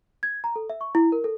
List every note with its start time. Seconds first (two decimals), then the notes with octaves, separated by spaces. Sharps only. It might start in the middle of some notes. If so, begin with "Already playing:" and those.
0.23 G#6
0.44 A#5
0.56 A4
0.70 E5
0.81 C#6
0.95 E4
1.12 A#4
1.24 A4